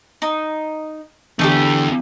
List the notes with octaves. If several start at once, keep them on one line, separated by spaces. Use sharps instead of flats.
D#4
E2 D3 A3 D4 G4